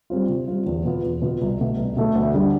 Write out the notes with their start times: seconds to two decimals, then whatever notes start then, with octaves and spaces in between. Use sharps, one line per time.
0.10 G3 C4 F4
0.28 C3
0.48 G3 C4 F4
0.66 E2
0.85 B2 B3 F4
1.03 E2
1.22 B2 B3 F4
1.41 C2
1.59 B2 A3
1.77 C2
1.97 B2 A3
2.15 D2
2.34 D3 G3